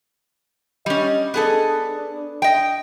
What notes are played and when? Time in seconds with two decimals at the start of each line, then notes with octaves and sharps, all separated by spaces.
0.86 G3 C#4 D#5
1.34 B3 D4 G#4 A4
2.42 D#5 G5